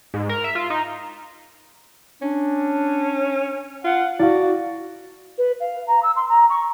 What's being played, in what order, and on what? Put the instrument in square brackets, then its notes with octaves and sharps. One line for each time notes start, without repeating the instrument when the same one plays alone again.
[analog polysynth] G#2
A#4
E5
F4
D#4
[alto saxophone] C#4 [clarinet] D4
[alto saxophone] F4 [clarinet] F#5
[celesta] E4 F5 [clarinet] F#4 [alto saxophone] D5
[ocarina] B4
F5
A#5
E6
C6
A#5
C#6